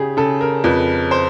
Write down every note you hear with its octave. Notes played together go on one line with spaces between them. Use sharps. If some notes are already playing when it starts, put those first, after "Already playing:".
Already playing: C#3 G4 G#4
C#3 A4
A#4
F2 B4
C5